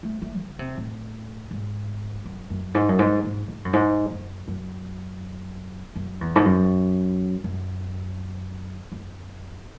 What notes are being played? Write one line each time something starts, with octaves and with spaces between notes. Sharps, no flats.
A3
A3
C#3
C3
A2
G#2
F#2
F#2
G#2
F#2
G#2
G#2
G#2
F#2
G#2
F#2
F#2
F#2
E2
G#2
F#2
F#2
F#2